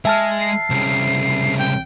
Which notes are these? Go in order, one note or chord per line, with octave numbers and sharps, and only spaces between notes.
G#3 G#4 E5 A5 F6
C7
C2 C#3
G5